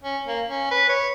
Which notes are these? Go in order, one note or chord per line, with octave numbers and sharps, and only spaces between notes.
C#4
A#3
C#4
B4
C#5